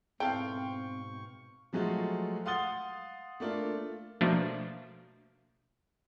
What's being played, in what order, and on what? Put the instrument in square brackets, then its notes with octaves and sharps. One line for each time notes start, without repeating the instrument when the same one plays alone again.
[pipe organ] G#2 B2 C#6 [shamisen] E3 A4 [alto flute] C4 [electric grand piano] F5 G5
[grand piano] F3 F#3 G#3 A3 F4 F#4
F5 F#5 C6 D#6 A6 G7
A3 A#3 D4 F4
[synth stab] B2 F3 A3 A#3 D4